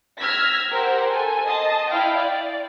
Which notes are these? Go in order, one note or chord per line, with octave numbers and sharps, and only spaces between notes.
E6 F6 G#6 A#6 B6
G4 A#4 C5 F#5
A4 G#5
D#5 A5 C6 D#6
E4 F5 G5
D5